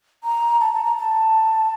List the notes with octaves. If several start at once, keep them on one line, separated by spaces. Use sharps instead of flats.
A#5
A5
A5
A#5
A5